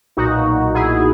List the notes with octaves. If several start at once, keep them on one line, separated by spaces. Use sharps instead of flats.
B1 A#2 D#4 F#4
E4 G#4